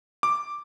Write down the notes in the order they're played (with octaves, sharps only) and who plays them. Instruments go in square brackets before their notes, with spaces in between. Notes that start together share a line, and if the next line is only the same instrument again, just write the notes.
[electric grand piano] D6